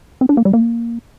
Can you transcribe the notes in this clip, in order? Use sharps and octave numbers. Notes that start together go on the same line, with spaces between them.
C4
D4
A#3
G3
A#3